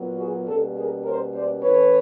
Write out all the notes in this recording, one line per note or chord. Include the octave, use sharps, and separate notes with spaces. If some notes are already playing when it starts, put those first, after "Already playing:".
Already playing: A#2 F#3 B3
F#4 G#4
B2 G3 A#3 C#4 G4 A4
G#4 A#4
A#4 C5
C5 D5
A2 E3 A3 C#4 B4 C#5